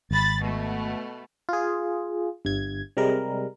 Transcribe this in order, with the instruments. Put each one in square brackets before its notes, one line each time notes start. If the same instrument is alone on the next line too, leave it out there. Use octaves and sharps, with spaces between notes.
[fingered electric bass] G#1 [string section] B5 A6
[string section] B2 A3
[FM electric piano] F4 G#4
G1 G2 G#6
C3 G3 G#3 A#4